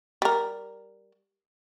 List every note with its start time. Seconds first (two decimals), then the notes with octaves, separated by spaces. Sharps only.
0.22 G3 A#4